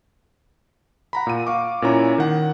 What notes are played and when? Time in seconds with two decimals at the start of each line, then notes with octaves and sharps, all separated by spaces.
1.13 F#5 A#5 B5
1.27 A#2 D#7
1.47 F5 C#6 D6
1.82 A#2 C#4 E4 C#5 A#5
2.18 D#3 F#5